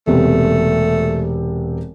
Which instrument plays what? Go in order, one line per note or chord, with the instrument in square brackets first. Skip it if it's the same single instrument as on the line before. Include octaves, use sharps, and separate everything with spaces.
[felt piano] E1 C3 B3 [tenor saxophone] A3